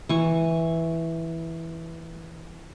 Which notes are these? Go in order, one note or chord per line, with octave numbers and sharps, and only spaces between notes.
E3 C#6